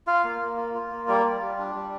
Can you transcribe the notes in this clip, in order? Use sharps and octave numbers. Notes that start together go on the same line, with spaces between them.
F4 F5
A#3
A#3
F4
F4
A#3
G3 D5
F4
G3
D4
G3